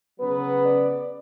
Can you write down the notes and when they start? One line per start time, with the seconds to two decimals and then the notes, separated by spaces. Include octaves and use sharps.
0.19 C#3 F#3 B3 B4
0.64 D5